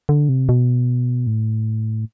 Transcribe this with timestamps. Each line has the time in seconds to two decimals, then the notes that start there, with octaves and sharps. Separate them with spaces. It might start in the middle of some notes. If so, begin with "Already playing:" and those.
0.09 D3
0.29 C3
0.49 B2
1.27 A2